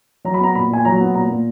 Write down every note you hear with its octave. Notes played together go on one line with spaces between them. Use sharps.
F#3 A#5
B5
B3 A#5
A#2 B5
A#2 G#5
F#3 A#5
B3
A#2 A#5
A#2